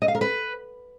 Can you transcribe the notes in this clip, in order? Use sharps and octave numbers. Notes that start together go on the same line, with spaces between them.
D#5
F5
A#4
B4